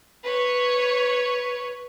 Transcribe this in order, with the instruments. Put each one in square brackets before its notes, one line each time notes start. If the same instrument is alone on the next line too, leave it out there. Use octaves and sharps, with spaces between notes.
[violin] B4 C#5